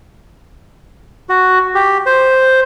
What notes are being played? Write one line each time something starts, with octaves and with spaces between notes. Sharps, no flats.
F#4
G4
C5